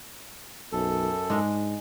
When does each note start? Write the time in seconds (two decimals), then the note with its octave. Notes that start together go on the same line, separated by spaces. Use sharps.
0.72 B1 F#2 A4
1.30 G#2 G#3 D4